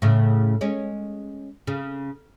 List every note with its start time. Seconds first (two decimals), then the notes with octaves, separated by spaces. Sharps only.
0.02 A2 C#3
0.61 G#3 C#4
1.67 C#3